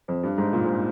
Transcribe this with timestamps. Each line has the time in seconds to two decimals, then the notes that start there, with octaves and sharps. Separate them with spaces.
0.08 F2
0.23 G2
0.38 G#2
0.53 A#2
0.65 G#2